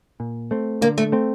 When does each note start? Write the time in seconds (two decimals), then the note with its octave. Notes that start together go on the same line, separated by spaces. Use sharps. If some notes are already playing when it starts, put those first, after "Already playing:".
0.20 A#2
0.51 A3 C4
0.81 D3 A#3
0.98 A3
1.12 A3 C4